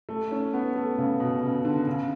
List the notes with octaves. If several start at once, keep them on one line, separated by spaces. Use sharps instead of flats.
A3
C#4
B3
A3
C#3
B2
C#3
D3
C#3